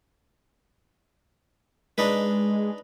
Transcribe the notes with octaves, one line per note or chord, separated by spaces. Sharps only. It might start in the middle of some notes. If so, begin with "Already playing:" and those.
G#3 D4 D#4 B4